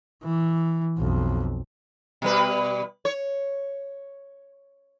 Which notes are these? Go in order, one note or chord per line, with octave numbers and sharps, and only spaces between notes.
E3
B1 F2
B2 G3 B4
C#5